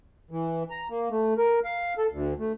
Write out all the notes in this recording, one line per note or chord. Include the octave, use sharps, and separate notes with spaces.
E3
A#5
A#3
A3
A#4
F5
A4
D2
A3